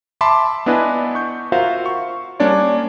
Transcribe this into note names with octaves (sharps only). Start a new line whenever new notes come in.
E5 A5 B5 C6 D6
B3 D4 E4 B4 D#5 G#5
C#6 G6
F4 F#4 A#4 C5 E5 F5
C#6
G3 A#3 C#4 D4 C#5 D5